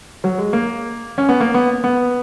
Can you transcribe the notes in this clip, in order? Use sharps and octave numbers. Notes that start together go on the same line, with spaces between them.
F#3
G#3
A#3
C#4
B3
A#3
B3
B3